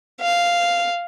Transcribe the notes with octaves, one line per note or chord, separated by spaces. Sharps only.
F5